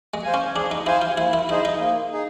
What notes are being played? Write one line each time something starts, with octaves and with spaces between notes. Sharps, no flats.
G#3
C5 F5 G#5
C#4
D4 G#4
D#4
E4 C5 F5 G#5
F4
A#3 E4
E4
D#4 E4 G#4 C5 D#5
D#4
A#3
D#4 G#4